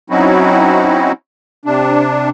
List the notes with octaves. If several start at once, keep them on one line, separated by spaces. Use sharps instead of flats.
F#3 C4 C#4 D#4 E4 F#4
C3 D4